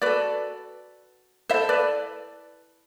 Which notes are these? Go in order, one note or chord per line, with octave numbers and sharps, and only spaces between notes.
F#4 A4 B4 D5
E4 A4 C5 E5
B4 D5